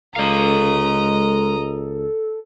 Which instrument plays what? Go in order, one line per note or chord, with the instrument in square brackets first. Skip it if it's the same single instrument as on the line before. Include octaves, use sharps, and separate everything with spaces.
[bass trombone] C#2 [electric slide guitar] G#3 F5 [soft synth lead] A4 [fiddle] D#5 A#5